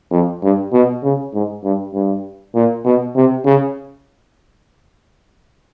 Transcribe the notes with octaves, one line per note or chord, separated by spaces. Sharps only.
F2
G2
B2
C#3
G#2
G2
G2
A#2
B2
C3
C#3